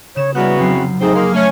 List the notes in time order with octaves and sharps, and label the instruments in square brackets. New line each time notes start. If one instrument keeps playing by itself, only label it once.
[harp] C#3 E7 [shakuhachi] C#5
[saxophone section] C#3 E3 B3 [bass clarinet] G3 [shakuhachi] F#4 [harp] A#4 F#6
[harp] F1 F#3 C7 [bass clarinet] C4
[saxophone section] G#2 A3 C4 [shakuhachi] D#4 [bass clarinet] G#4
[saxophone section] A#3 [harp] C6 F6
[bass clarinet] A3 [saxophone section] C#4 [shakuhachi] C#5